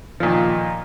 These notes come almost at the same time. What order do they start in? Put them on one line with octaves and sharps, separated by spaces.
F3 A#2 D#3